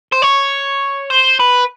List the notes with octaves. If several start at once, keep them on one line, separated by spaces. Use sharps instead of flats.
C5
C#5
C5
B4